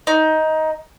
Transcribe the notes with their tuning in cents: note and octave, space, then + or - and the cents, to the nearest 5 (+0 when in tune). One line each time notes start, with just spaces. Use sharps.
D#4 +15